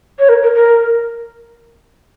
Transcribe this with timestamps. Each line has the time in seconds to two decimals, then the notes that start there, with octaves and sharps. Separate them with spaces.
0.19 C#5
0.29 A#4
0.43 A#4
0.55 A#4